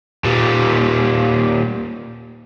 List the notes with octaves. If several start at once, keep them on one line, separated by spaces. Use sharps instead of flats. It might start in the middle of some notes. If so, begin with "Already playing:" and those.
A#2 G3